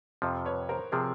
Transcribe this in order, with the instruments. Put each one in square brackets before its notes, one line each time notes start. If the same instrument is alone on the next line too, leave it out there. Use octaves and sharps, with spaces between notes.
[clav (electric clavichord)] F2 C3 F3
[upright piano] B4 C#5
A#4 C5
[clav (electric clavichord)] C3 F3 [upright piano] G#4 A#4